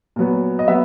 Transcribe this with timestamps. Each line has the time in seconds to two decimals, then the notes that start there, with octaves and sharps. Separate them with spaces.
0.16 A#2 F#3 B3
0.59 D#5
0.68 F#3 B3 E5